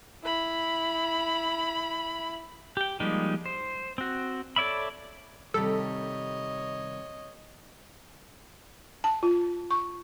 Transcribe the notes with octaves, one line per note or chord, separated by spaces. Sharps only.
E4 B5
G4 G5
F3 G3 G#3 A#3 D#4
C5
C4 F#4
A4 C#5 D5 E5 B5
C3 D#3 G3 A4 C#5 D#5
A5
F4
C#6